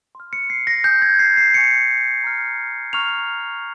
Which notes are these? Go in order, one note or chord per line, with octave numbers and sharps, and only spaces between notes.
C6 F6
C#7
C7
A#6
G#5 D#6 G6
G#6
C7
C7
G#5 C#6 G6 C#7
A#5 F6
A#5 C#6 F6 F7